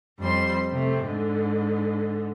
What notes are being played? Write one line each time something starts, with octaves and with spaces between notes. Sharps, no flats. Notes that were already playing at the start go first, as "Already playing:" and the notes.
F2 G3 C4 C6
C3 A3
G#2 D3